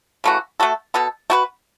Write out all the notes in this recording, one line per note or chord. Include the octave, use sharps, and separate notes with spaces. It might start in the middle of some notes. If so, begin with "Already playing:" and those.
C#3 E3 A3 F#4
A3 F#4 A4
B2 B3 A4
A3 F#4 B4